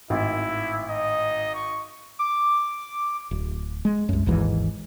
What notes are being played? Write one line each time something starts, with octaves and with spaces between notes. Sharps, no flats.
G#1 A2 E4
D#4 D#5
C#6
D6
D1
G#3
C2 F#2
G#1 D#2 G#2 E3